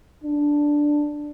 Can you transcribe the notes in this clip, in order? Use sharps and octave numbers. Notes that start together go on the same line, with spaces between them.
D4